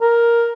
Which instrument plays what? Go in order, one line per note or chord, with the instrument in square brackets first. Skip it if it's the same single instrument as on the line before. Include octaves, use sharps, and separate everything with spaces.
[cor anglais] A#4